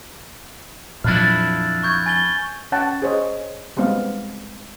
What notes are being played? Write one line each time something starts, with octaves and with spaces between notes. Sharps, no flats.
F2 A#2 F#3 D4 E4 F6 A6
C#6 G6 G#6
G#5 A6 G7
C#4 C#5 F#5 G5 A5
G#4 C5 C#5 D#5
G3 G#3 B3 C4 F5